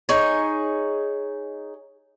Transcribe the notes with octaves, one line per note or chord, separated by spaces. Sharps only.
D#4 G#4 C#5